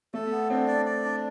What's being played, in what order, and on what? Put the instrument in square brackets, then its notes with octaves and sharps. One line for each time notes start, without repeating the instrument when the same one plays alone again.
[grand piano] A3 [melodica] A4
[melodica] B3
[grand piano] C4 [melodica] D4
[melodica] D5
D5
D4